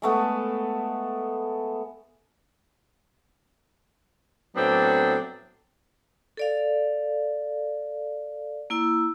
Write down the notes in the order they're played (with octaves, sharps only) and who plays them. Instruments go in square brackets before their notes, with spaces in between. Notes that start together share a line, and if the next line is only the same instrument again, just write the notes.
[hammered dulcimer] G#3 A3 B3 A4
[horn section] A2 F#3 B3 C4 D4
[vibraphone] A4 D5 F5
A#3 E4 E6